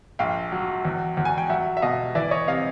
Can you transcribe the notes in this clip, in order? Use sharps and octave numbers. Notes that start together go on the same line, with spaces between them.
A#1 F5 G5
F#3
E2
E2
G#5
G5
F#3 E5 F#5
E5
B2 D#5 F5
E3 D5 E5
C#5 D#5
C3 D#5 F5